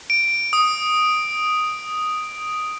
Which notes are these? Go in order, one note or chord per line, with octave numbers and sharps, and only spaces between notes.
D7
D#6